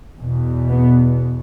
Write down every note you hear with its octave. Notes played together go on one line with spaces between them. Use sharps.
E2 B2
B3